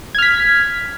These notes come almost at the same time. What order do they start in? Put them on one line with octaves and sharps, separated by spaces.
G#6 F6 B6